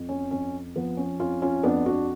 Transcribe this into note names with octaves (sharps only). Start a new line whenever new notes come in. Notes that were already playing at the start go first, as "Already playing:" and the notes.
Already playing: F2
C#4
F2 C#4
F3 B3
C#4
F2 C#4 F4
C#4 F4
F2 B3 D4
D4 F#4